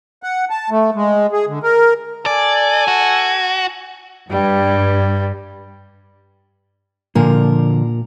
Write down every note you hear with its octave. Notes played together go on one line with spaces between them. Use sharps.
F#5
A5
A3
G#3
G#4
D3
A#4
A4 D5 G#5
F#4
G2 G3
A#2 D3 F3 A#4